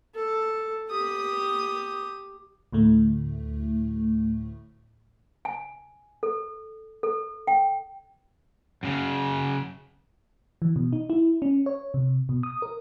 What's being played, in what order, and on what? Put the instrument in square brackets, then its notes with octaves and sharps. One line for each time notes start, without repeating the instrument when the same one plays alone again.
[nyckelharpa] A4
G4 D#6
[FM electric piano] D2 A2 A3
[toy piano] G#5
A4
A4
G5
[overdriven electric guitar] F#2 C#3
[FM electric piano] E3
B2
D#4
E4
C#4
C#5
C3
B2
D#6
A#4